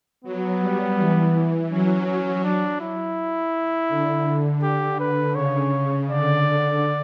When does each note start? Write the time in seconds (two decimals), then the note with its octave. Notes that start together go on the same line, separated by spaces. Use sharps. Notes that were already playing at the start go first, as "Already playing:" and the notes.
0.24 F#3 B3
0.60 G3
0.98 E3
1.70 F#3 C#4
2.06 C#4
2.44 D4
2.80 E4
3.89 D3
4.63 G4
4.99 B4
5.35 C#3 C#5
5.72 C#3
6.08 D3 D5